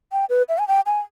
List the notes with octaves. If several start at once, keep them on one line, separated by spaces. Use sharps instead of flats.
G5
B4
E5
G#5
G5
G#5